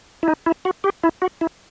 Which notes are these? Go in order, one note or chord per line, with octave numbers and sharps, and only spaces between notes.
E4
D#4
E4
F#4
G4
E4
F#4
E4